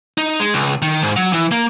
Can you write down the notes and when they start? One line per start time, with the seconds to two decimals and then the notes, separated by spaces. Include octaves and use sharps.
0.18 D#4
0.40 G#3
0.54 C#2
0.82 D#3
1.02 G#2
1.16 F#3
1.33 E3
1.51 A#3